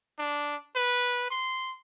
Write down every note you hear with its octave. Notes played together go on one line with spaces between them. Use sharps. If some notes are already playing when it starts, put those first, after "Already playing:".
D4
B4
C6